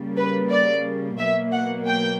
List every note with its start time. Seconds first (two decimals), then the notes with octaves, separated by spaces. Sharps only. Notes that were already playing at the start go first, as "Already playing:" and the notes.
Already playing: C#3 G3 A#3
0.18 B4
0.51 D5
1.19 B2 F#3 A#3 E5
1.53 F#5
1.87 G5